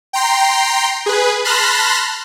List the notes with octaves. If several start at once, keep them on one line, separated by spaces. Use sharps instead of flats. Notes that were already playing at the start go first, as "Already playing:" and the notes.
G5 A#5 C6 C7
G#4 B4
A5 B5 C6 F6 F#6 A#6